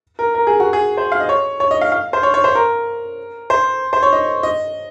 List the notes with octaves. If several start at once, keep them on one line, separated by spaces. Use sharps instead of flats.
A#4
A#4
G#4
F#4
G#4
C5
F5
D#5
C#5
C#5
D#5
F5
F5
C5
C#5
C#5
C5
A#4
C5
C5
C#5
D#5
D#5